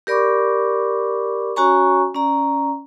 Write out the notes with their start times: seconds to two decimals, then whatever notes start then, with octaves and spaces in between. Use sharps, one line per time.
0.07 G4 A#4 D5 B5 C#6 D6
1.56 C#4 F#4 C#5 G#5 A#5 C#6
2.14 C#4 D5 A#5